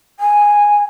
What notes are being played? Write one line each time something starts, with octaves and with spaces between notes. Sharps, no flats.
G#5